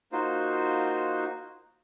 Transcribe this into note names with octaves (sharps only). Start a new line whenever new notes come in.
A#3 D#4 F4 F#4 C5